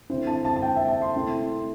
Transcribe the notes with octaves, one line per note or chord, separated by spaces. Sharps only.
D3 C4 E4 C5
A5
A5
A5
G5
E5
A5
C6
C3 A3 E4